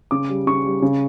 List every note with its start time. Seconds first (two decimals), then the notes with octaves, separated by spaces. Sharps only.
0.11 C#3 D6
0.29 G3
0.47 C#3 C#6
0.64 G3
0.82 C#3